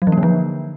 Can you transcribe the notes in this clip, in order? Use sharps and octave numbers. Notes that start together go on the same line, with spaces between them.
F#3
E3
A#3
D3
F3